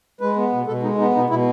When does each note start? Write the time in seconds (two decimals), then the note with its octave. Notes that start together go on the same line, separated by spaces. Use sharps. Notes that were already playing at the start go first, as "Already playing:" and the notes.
0.21 G#3 B4
0.36 B3
0.52 B2
0.67 B2 A4
0.82 G#3 D#4
0.98 B3 D#4
1.14 B2 D#4
1.29 B2 E4